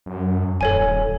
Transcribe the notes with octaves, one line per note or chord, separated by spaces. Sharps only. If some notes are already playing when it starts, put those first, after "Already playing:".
F#2
D#1 A4 C#5 G#5